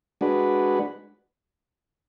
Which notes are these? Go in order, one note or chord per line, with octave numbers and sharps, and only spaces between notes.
G#3 D4 F#4 B4